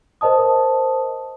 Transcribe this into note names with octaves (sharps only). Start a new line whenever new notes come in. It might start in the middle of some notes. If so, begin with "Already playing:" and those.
A#4 C5 D#5 A5 D#6